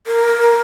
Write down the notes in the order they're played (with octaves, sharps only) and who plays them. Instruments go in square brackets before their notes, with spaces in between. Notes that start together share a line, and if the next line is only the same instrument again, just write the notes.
[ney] A#4